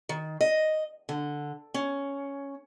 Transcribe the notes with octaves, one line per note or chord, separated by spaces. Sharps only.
D#3
D#5
D3
C#4